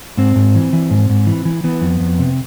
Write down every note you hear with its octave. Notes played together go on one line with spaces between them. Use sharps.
G#2 C4
G#2
E3
E3
G#2
G#2
E3
E3
E3 B3
F2
F2
C3